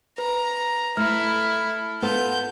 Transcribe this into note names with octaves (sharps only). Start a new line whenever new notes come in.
B4 A#5
A3 E4 A4 F6
B3 F4 A4 G6